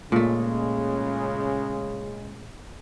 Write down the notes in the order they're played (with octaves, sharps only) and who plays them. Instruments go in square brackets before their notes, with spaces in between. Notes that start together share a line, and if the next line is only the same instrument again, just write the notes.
[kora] A#2 A3 [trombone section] C#3 G#3